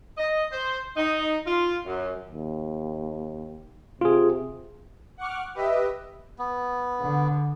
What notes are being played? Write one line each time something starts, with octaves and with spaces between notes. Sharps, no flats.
D#5
C5
D#4
F4
F#2
D#2
C3 F4 G#4
F#5 C#6 D6 F6
G4 B4 D#5 E5
B3
D3